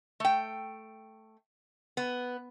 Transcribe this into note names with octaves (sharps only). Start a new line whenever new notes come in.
A3 G5
B3